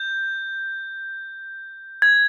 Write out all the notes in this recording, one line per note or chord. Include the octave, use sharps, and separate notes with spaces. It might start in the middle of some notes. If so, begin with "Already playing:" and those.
Already playing: G6
G#6